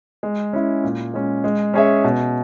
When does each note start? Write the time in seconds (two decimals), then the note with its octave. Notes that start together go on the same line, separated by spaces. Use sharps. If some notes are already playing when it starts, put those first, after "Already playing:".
0.23 G#3
0.53 C#4 E4
0.84 A#2
1.14 G#3 C#4
1.44 G#3
1.74 C#4 G#4 C#5 E5
2.04 B2